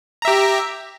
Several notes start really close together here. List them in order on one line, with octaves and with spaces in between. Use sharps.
A#5 E5 G4